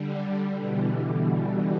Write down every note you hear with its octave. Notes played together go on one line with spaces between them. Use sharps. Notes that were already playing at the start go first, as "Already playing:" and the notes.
Already playing: D3 G3
D3 G3
B2 E3
B2